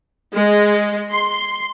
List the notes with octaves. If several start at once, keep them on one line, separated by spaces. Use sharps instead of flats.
G#3
C6